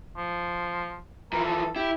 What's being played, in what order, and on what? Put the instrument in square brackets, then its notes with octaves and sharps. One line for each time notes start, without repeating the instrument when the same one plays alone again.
[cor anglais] F3
[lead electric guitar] E3 F3 [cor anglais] A#4
[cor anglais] A4
[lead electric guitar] E4 [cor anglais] G4